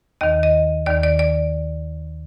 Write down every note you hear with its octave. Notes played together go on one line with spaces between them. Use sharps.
D#2 D#3 D#5
D#5
D#2 D#3 D5
D5
D5